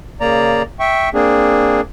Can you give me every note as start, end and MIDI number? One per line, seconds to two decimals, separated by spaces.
0.21 0.62 49
0.21 0.62 58
0.21 0.62 74
0.21 0.62 82
0.80 1.09 76
0.80 1.09 79
0.80 1.09 85
1.14 1.81 58
1.14 1.81 60
1.14 1.81 62
1.14 1.81 68